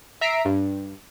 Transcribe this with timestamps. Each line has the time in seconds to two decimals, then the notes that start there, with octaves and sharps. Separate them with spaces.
0.21 E5 A#5 B6 C7 D7
0.45 G2